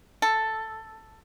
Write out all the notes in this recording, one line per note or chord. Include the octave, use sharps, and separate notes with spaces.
A4